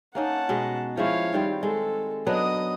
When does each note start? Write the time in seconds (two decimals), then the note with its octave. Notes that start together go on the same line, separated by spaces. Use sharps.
0.15 A#3 C#4 D#4 F#5 A5
0.49 B2 G#3 D#5
0.97 F3 G#3 E4 C#5 F5
1.33 D#3 G3 C4
1.63 G#3 A4
2.27 F#3 B3 D4 D#5 D#6